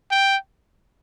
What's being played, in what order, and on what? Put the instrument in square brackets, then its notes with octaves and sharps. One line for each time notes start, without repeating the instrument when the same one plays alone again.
[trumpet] G5